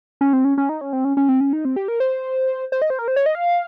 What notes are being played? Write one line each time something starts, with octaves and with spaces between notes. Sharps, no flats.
C#4
C4
C#4
C#4
D#4
C#4
C4
C#4
C#4
C4
C#4
D#4
C4
G4
A#4
C5
C5
D#5
C5
A#4
C5
C#5
D#5
F5